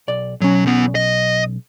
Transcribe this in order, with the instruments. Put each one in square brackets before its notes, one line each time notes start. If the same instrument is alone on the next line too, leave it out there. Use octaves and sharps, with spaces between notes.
[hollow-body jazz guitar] B1 D5
[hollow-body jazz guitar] B1 C#4 [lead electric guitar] F#3
[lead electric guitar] E2 B3
D#5